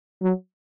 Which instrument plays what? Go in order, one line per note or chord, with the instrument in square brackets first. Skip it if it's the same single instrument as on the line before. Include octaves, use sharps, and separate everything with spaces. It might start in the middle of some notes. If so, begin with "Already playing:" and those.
[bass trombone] F#3